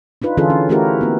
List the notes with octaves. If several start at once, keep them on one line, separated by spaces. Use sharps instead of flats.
D4 D#4 F4 B4
D3 E3 C#4 F4 G#4 A4
C#4
A3 C#4 E4 F#4 G4 A#4
A#3 B3